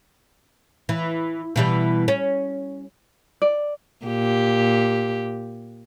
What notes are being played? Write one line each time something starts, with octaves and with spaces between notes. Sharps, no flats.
E3
B2 E3 G3
C#4
D5
A#2 G4